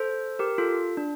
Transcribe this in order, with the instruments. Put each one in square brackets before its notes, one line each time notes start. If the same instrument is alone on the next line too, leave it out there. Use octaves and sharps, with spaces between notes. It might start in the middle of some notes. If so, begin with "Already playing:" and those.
Already playing: [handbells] A4 C5
G4 A#4
F4 A4
D4